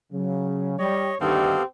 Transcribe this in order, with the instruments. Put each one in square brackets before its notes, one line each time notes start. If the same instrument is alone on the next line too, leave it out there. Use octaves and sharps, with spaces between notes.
[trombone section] C#3 [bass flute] F#3
[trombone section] G3 [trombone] C#5 [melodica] D#5
[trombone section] D2 G2 D#3 [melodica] B3 A4 F5 [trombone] C4 [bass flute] G4